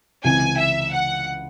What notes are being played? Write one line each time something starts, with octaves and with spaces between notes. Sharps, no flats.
C#2 C3 E3 G#5
E5
F#5